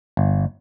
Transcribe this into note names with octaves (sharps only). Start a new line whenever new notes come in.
G1